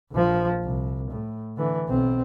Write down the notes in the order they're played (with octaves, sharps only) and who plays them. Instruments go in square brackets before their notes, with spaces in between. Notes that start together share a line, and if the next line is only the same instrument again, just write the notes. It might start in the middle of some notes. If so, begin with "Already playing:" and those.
[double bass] A#1 F3
C2
A2
D3 E3
B1 C4